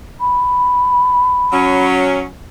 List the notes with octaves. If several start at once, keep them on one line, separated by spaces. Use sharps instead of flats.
B5
F#3 C#4